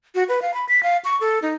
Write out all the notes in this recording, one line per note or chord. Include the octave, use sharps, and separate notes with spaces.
F#4
B4
F5
B5
B6
F5
C#6
A4
D#4